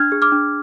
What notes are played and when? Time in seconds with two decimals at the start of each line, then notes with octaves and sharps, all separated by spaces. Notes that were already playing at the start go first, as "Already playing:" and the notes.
Already playing: D4 F6 G#6
0.12 G#4
0.22 D6 F6
0.32 D4